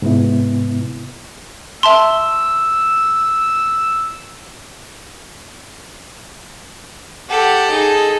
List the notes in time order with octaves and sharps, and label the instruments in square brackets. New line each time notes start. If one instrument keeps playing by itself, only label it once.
[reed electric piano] G#2 C3 B3 E4
[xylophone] E5 A5 C6 [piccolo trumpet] E6
[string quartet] G4 F#5 [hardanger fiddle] A4
[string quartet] D#4 G#4